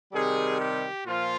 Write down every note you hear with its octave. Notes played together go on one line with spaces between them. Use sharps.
C3 D#3 G3 G#4
G4
A#2 F3 F4